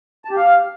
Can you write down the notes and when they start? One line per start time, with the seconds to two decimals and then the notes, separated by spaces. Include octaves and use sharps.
0.25 A5
0.31 G4
0.37 F5